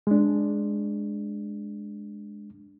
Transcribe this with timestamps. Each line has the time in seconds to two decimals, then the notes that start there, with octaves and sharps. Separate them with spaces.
0.07 G#3 D4